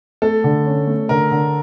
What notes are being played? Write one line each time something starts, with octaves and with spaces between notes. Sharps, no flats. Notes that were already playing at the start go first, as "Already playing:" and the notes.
A3 A4
D3
C#4
A3
D3 A#4
D3